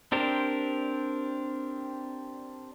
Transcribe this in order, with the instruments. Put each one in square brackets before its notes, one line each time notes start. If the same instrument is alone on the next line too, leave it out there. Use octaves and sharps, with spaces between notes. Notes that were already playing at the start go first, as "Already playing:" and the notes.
[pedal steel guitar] C4 D4 G4 A#4 C5